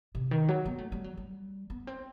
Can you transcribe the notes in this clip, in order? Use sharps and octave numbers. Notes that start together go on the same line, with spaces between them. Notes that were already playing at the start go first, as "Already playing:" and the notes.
C3
D#3
F#3
B3
A3
G3
F#3
G3
B3
C4